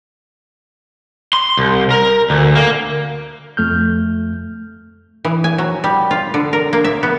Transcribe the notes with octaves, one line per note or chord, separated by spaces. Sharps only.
C6
C2
A#4
D2
A#3
F2 A3 F6 G6
E3
G#5
F#3
G3
F4
D3
A#4
A#3
E5
B3